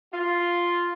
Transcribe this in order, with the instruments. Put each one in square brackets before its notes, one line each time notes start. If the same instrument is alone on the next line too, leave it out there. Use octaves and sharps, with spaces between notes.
[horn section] F4